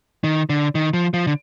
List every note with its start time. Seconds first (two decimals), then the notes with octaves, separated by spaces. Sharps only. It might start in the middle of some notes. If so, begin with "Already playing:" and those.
0.24 D#3
0.50 D3
0.75 D#3
0.94 F3
1.14 F3
1.27 D3